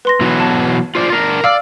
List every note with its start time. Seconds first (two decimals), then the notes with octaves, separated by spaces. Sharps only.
0.05 B4 C6 A#6
0.21 B2 E3 F#3
0.40 A5
0.95 F4 C5 D5
1.12 D4 A#4
1.44 D5 F5 E6 F6